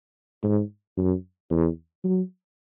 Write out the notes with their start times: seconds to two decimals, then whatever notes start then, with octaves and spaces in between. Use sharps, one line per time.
0.44 G#2
0.97 F#2
1.51 E2
2.04 F#3